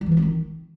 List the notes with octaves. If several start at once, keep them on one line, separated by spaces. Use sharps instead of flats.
G3
E3
A#3
C4
D#3